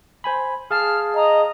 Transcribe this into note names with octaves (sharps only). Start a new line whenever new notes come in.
C5 G#5 B5
G#4 F5 A5 F6
D#5 A#5